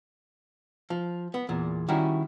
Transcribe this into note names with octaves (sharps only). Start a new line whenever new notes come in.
F3
B3
E2 A#2
D#3 G3 C#4 E4 F#4